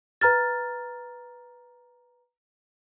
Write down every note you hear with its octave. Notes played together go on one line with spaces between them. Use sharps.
B4 A#5 F6 A6